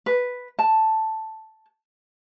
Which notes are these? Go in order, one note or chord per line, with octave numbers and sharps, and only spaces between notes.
B4
A5